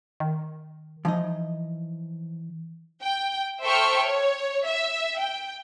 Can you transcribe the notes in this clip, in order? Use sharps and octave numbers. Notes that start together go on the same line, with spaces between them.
D#3
E3 F3 D#4 D#5
G5
A4 C5 E5 G5 C#6 F6
C#5
E5
G5